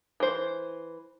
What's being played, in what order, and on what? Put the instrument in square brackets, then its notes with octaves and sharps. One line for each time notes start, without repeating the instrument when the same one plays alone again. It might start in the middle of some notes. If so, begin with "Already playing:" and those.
[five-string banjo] E3 C5